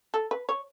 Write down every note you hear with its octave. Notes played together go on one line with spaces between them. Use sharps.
A4
B4
C#5